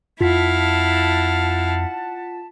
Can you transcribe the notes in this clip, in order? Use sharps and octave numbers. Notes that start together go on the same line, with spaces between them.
F2 E4 F4 F5 F#5 A5 B6